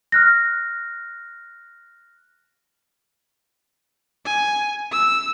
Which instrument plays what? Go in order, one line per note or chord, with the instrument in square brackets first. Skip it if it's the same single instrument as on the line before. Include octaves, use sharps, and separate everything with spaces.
[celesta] F6 F#6 A#6
[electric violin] G#5
E6